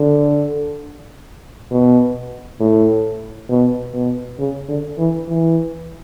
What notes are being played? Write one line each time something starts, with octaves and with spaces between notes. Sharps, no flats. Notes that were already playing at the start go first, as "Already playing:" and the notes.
Already playing: D3
B2
A2
B2
B2
C#3
D3
E3
E3